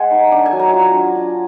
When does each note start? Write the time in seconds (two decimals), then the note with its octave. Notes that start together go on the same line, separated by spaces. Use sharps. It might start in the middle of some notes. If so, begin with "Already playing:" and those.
Already playing: G#3 F#5 G#5
0.11 D#4
0.32 D4
0.46 G#5
0.52 F#3
0.59 A#5
0.74 F4
0.94 D4
1.15 D4